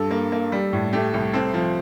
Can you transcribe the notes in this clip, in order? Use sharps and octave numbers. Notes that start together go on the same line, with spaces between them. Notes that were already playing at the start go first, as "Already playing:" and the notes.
Already playing: G2 A4
A#3
A#3
G3
A2
A3 G4
C2
C4 A4
F3